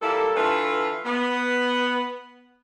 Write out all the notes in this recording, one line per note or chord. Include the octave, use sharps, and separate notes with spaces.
A#2 G3 A#3 E4 A4
D3 E3 A3 F4 A4 B4
B3